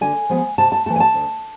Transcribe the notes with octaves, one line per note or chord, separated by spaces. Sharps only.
D3 G#5
F3 G#3 B3
C3 A5
A5
E3 A3 A5
G#5
A5
D2